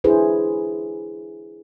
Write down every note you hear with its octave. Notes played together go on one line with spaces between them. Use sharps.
D4 E4 G#4 B4 C5